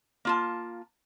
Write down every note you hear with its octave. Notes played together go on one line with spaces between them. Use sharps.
A#3 F4 A5